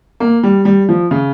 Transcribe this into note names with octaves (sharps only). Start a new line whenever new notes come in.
A#3
G3
G3
F3
C#3